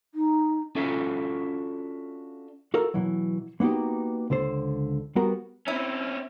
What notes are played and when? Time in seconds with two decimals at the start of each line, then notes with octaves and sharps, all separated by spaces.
0.15 D#4
0.75 C#4 D4 F4 F#4 A4 E5
2.74 F#4 A4 A#4 F5
2.94 B2 E3 F#3
3.60 A#3 B3 D#4 F#4 G4
4.30 C#2 D3 A4 C5
5.16 G3 B3 F#4 A#4
5.68 C4 C#4 E4